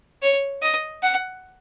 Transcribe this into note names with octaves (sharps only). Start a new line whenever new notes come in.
C#5
D#5
F#5